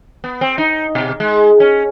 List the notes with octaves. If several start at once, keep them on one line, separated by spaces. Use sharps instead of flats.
B3
C4
D#4
B2
G#3
C#4